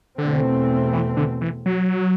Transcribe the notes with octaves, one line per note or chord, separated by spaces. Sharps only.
E2 B2 D3 A3 C4
E3
D3
E3
F#3